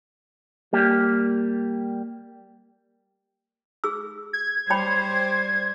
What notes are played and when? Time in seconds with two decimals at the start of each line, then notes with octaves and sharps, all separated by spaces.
0.73 G3 A#3 G4
3.84 G#4 E6
4.33 G#6
4.70 G3 C5 C#5 G5 B5